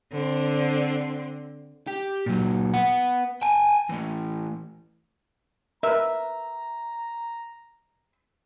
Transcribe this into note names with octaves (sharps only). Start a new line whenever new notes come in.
D3 C4
G4
A#2 F#3
B3 F#5
G5 G#5
A2 E3
A#4 B4 E5 A#5